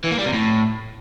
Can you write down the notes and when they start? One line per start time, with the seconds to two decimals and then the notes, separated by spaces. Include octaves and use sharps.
0.04 E3
0.11 A#3
0.19 G3
0.26 C3
0.33 A2